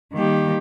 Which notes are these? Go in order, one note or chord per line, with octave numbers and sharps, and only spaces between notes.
D#3 G3 A#3 G4